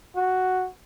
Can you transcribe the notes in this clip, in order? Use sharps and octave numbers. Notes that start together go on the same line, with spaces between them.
F#4